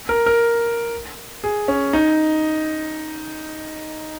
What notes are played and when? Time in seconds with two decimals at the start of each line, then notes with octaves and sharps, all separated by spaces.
0.09 A#4
0.26 A#4
1.44 G#4
1.68 C#4
1.93 D#4